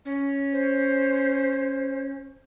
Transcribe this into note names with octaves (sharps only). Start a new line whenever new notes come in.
C#4
C5